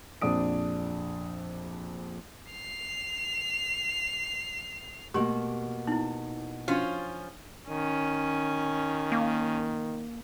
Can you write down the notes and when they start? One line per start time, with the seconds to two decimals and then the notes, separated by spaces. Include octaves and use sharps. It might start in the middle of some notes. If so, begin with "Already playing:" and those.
0.22 A#1 F2 D4 D#6 D7
2.51 C7 F7
5.14 B2 A3 A#3 F#4 G4 C6
5.87 B3 D#4 E4
6.68 F3 C#4 D4 F4 F#4
7.69 D#3 C#4
9.12 A#3